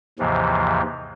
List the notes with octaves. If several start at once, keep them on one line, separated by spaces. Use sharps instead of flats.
D#2 G#2 C3 E3 F3